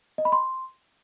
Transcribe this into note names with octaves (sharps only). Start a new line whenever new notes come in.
D#5
B5
C6